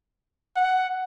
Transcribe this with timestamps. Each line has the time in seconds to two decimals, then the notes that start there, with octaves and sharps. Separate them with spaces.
0.57 F#5